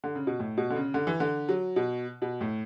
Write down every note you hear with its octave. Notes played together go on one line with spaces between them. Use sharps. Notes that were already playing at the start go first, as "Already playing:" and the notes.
D3
C#3
B2
A2
B2
D3
C#3
D3
E3
D3
F#3
B2
B2
A2